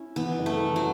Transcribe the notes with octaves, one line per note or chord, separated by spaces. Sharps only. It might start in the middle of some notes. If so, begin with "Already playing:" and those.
Already playing: C#4 E4
E3 B3
F#1
A3
E3
F#3